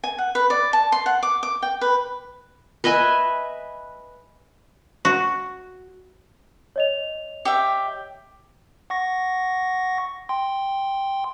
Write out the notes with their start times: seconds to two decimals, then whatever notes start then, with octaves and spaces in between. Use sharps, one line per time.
0.04 G#5
0.18 F#5
0.35 B4
0.50 D5
0.73 A5
0.92 C6
1.06 F#5
1.23 D6
1.43 D6
1.62 G5
1.81 B4
2.84 B4 D#5 E5 G#5
5.05 F#4
6.76 C#5 D#5 F7
7.45 G4 E5
8.90 F#5 C#6 A#6
10.29 G5 C6